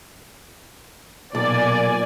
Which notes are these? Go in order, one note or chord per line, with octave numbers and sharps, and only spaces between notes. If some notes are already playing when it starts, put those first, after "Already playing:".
B1 A#2 D5 G#5